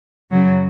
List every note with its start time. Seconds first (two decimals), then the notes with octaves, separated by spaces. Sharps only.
0.31 F#2 C#3 F#3